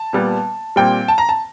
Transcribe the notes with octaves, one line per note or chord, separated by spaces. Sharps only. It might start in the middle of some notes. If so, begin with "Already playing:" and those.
Already playing: A5
A#2 G3 B3
A#2 G3 C4 G5
A5
A#5
A5